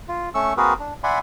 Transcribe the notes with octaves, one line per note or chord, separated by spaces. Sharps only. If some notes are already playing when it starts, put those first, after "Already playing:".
F4
A3 C#4 C#6 E6
A#3 C4 F#4 G#4 A#4 B4
D4
D5 E5 F#5 G#5 B5 C6